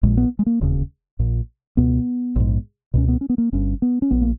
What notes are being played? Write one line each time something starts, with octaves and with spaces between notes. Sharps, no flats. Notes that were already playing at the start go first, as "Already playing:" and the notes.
A#1 A#2 G#3
B3
G#3
A#3
E1 D#2 C#3
A#1 A#2
C#2 B2 B3
A#1 G#2
C#2 B2 C#4
B3
C#4
B3
A#3
G1 G2 C#4
B3
C#4
A#1 B3
A#3